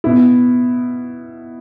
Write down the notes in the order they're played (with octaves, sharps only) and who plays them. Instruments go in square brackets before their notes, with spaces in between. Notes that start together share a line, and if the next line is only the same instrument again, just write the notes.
[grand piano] B2 B3 E4